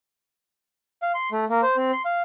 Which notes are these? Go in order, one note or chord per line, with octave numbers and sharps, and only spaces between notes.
F5
C6
A3
A#3
C5
C4
C6
F5